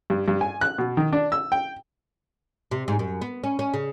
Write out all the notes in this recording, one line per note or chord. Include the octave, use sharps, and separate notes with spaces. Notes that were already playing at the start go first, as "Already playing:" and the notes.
G2
G2
G#5
F#6
B2
D#3
D4
E6
G5
C3
G#2
F#2
B3
C#4
C#4
C#3